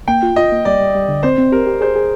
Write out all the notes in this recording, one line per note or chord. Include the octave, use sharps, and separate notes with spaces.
A#3 G5
F4
F4 D#5
A#3
G3 D5
G3
G3
D3
C4 C5
C4
G4 A#4
G4
G#4 C5
G#4